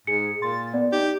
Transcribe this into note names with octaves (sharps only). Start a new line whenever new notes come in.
G#2 G#4 C#7
A#2 C6 A6
B3 D5
D#4 G4